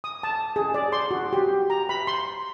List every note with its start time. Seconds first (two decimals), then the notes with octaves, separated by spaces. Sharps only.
0.04 D#6
0.23 A5
0.56 G#4
0.74 D5
0.92 C6
1.11 F#4
1.33 G4
1.70 A#5
1.89 B5
2.07 C6